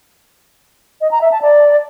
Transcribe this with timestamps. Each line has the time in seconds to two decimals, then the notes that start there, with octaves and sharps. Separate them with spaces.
1.01 D#5
1.11 A#5
1.21 E5
1.32 A5
1.42 D5